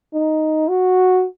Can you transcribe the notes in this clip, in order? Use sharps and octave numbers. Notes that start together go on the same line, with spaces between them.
D#4
F#4